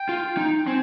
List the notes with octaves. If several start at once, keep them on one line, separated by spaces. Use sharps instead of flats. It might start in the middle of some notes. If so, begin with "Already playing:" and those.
Already playing: G5
F4
D#4
C4 G#5